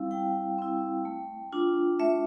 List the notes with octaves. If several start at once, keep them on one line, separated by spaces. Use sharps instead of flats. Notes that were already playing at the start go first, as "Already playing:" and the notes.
Already playing: G3 C4 E4 F5
G3 G5
C4 E4
A3
D4 F4
A3 E5